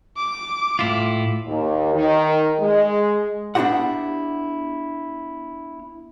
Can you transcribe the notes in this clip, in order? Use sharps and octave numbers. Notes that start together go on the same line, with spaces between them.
D6
A2 E4 F4
D#2
D#3
G#3
B3 D4 E4 F#4 G4 F#5